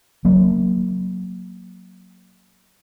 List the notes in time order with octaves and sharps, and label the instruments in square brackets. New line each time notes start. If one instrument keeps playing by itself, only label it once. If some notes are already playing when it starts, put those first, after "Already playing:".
[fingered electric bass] F#3 A#3